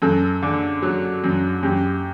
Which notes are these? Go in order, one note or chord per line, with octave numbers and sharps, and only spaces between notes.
F#2 A4
D3
F#3
F#2
F#2 G4